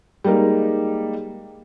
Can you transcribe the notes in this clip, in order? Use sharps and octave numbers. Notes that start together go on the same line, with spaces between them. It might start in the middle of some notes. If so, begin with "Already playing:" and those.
G3 G#3 A#3 D#4 A#4